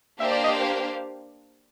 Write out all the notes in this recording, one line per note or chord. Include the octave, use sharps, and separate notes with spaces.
A#3 D4 G4 C5 E5 F5
D5
D#5